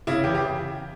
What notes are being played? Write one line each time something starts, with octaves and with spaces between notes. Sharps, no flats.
C#3 E4
E2 G4
G4